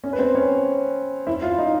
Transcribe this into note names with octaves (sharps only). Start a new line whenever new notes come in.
C#4 C#5
B4
C4 C5
C#4 C#5
E4 E5
F4 F5
D#4 D#5